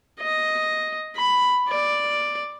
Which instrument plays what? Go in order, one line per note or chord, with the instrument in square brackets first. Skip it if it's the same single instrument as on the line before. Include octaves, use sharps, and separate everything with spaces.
[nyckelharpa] D#5
B5
D5